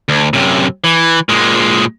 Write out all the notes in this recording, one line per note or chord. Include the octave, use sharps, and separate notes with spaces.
D2
F#2 C3
E3
A#2 G#3